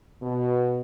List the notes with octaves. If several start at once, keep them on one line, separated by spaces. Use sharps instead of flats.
B2